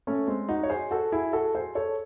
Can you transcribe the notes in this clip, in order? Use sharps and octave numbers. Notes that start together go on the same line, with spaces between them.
A3 C#4
G#3 C4
D#4 F#4
C#5
G#4 C5
F#4 A4
E4 G#4
F#4 A4
G#4 C5
A4 C#5